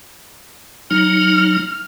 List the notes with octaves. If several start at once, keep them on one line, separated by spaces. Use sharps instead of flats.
F#3 D#4 F6